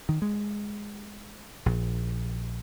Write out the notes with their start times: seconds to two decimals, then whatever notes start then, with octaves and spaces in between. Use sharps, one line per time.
0.09 D#3
0.22 G#3
1.66 A#1